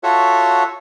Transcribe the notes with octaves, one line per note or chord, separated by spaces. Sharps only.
F4 F#4 A4 C#5 E5 F#5